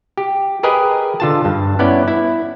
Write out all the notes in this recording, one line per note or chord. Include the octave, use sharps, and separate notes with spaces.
G4
G4 G#4 A#4 B4 D#5 G#5
D3 F4 A5
G2
B3 C#4 E4 D5
E4